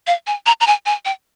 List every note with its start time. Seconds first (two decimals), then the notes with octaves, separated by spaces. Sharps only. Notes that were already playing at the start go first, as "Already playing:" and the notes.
0.07 F5
0.27 G#5
0.46 A#5
0.61 A#5
0.67 G#5
0.86 G#5
1.05 G5